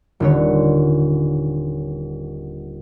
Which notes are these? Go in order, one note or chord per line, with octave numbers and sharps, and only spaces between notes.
D#1 D3 C#5